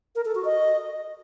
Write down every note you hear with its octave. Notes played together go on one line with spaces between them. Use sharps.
A#4
A4
F#4
D#5